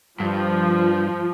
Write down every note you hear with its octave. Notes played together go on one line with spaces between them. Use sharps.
G2 F3